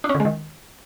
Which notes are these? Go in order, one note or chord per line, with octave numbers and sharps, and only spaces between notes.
D4
C#4
D3
G#3
D#3